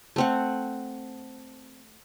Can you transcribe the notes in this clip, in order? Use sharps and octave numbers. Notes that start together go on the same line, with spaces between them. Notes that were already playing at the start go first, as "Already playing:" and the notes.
A3 C4 F#5